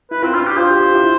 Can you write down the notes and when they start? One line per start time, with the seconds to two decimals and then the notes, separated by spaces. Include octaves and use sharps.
0.11 E4 B4
0.23 C4 F4
0.34 D4 F4
0.47 G4
0.58 F4 C5
0.71 G4
0.82 F4
0.94 E4